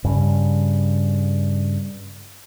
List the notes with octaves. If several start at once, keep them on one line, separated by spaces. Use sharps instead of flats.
G2 C#3